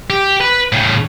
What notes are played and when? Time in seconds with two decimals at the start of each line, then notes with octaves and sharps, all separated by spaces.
0.10 G4
0.41 B4
0.72 A2 C#3